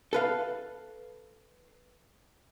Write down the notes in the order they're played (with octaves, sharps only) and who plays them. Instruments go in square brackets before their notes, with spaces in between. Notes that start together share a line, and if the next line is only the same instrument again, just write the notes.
[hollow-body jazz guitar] A4 B4 F5